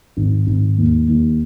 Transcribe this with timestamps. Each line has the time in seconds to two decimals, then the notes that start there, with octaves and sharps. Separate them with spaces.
0.17 G#1
0.47 G#1
0.77 D#2
1.08 D#2